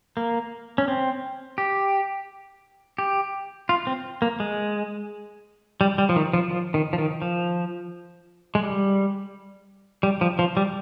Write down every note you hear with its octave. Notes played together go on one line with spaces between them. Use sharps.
A#3
C#4
C4
G4
G4
F4
C4
A#3
G#3
G3
G3
F3
D#3
F3
F3
D#3
F3
D#3
F3
G#3
G3
G3
F3
F3
G3